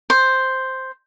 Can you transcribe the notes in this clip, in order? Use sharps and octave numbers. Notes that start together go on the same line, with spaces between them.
C5